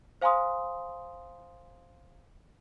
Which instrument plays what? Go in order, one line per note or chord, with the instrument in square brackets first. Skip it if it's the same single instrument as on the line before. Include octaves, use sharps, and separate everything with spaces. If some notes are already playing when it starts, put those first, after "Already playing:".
[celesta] C5 F5 G#5 A#5 C6 D#6